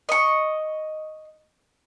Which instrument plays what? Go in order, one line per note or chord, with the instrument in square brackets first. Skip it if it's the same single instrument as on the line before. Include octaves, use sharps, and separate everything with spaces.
[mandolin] D#5 C#6